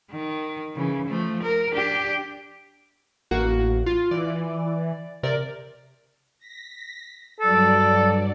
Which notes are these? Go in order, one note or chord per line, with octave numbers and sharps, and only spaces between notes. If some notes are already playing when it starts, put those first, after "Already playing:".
D#3
C#3 E3
F3 A3
A#4
D4 G4
A1 A#3 F#4
F4
E3 D5
C3 A#4 D5
A#6 B6
G2 F#3 A4 D5